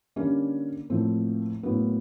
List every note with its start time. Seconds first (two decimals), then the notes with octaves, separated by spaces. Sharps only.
0.16 D3 G3 A#3 C#4
0.90 A2 F3 A#3 C4
1.63 A2 F#3 A#3 B3